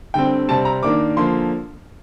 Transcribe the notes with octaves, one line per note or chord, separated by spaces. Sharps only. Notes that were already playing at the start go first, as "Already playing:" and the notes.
D3 G3 C4 G5
C3 G3 C4 A5
A#5
D#3 A#3 D4 D6
D3 F3 A#3 C6